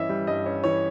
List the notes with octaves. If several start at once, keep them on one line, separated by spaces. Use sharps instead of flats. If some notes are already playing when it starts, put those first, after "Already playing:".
Already playing: G2 E3 C#4 D#5 E5
G3
G2 D#5
C#4
E3 C#5